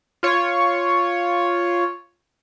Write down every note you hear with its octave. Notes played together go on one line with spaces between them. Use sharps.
F4 C#5